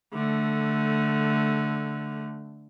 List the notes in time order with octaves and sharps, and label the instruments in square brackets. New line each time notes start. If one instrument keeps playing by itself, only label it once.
[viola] D3 A3